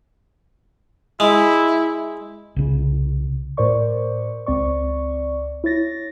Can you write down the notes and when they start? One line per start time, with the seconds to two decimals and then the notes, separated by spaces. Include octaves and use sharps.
1.20 G#3 E4
2.56 C2 C#3
3.57 A2 A#4 C5 D5 C#6
4.46 C#2 C4 D5 C#6
5.64 E4 C#5 A6 A#6